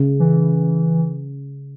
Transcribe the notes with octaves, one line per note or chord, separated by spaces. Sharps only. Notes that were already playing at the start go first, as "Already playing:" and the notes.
Already playing: C#3
E3